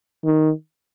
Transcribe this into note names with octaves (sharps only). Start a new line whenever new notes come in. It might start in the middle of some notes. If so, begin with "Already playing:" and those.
D#3